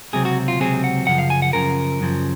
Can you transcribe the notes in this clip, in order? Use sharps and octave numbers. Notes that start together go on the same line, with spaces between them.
C#2 C3 F#3 C4 G#4
F#4
F4
C#2 C3 F#3 C4 G#4
F#5
F#2 C#3 F3 F#5
F5
G#5
F#5
F#2 C#3 F3 A#4
F#2 C#3 F3